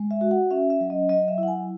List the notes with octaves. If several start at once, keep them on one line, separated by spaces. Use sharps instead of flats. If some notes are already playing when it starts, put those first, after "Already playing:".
Already playing: G#3
E5
F#4
F#5
C#4 E5
E5
F#3
D#5
F#3 D#5
E5
E4
F#5
G#5